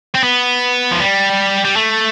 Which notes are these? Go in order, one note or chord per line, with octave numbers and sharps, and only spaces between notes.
C4
B3
F3
G3
G3
A3